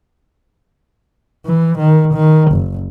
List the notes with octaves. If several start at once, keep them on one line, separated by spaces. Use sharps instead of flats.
E3
D#3
D#3
F#1